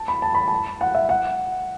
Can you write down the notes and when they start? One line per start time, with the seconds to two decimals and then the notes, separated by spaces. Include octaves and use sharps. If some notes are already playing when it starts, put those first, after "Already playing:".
Already playing: A5
0.08 B5
0.22 A5
0.34 B5
0.48 A5
0.81 F#5
0.95 E5
1.09 F#5